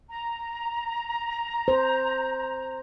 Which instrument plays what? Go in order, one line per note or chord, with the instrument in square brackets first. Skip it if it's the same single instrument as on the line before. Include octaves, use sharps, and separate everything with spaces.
[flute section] A#5
[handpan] C5